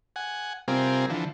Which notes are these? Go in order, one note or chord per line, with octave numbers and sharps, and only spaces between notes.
F#5 G#5
C3 G3 C4 F4 A#4 G#5
D3 E3 F3